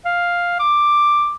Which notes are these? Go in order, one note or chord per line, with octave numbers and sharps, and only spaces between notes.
F5
D6